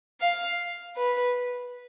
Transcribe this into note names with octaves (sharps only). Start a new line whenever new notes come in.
F5
B4